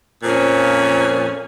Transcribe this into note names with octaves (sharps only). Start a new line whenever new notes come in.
F2 A#2 F3 C#4